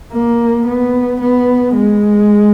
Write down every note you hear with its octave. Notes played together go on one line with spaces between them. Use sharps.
A#3
B3
B3
G#3